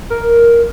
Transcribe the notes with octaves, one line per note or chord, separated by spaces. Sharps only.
A#4